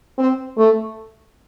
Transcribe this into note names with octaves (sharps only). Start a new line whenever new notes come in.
C4
A3